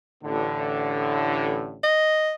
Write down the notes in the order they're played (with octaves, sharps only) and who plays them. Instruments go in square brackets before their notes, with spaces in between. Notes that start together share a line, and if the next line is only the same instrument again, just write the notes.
[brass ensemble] A1 A2 D3
[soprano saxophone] D#5